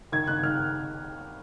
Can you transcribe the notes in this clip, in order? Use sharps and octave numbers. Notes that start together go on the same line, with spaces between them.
D#3 G#6
D#3 F#6
D#3 F6